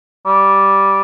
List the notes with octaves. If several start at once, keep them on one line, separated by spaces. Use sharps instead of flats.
G3